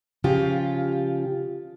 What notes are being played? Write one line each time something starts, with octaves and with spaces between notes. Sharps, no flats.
C#3 F3 F4 G4